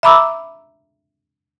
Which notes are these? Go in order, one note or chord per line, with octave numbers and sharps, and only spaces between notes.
E5 A#5 B5 D6 E6